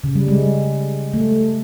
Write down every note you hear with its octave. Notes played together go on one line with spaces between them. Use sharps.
C#3
G3
G#3
A3